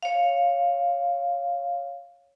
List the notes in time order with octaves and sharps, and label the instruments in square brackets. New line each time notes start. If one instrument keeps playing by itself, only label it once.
[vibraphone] C#5 F5